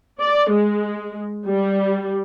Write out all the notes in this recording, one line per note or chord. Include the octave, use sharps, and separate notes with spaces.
D5
G#3
G3